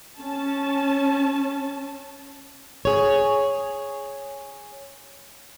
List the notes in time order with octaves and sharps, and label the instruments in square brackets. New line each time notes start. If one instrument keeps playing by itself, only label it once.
[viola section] C#4 A5
[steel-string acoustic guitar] G#4 C#5